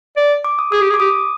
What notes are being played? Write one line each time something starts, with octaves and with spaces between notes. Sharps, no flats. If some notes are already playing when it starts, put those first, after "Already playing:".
D5
D6
D#6
G#4 D#6
G4
G#4
D6
G4 D#6